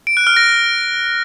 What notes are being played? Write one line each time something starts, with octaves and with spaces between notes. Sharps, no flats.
D7
F#6
F6
A#6